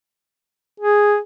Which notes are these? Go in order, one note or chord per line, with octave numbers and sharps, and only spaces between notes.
G#4